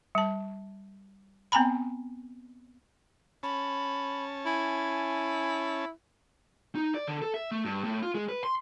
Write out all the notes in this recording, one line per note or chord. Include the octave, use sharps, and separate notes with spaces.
G3 A5
B3 C4 G5 G#5 A#5 B5
C#4 A5 B5
E4 G#5
D#4
D5
D3
A4
E5
A3
G2
A2
F4
G#3
B4
C6